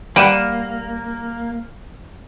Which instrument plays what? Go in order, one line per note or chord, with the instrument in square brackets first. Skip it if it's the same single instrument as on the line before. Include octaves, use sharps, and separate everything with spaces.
[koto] G3 [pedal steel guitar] A#3 [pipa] F#5 G5 [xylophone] B5 D#7 E7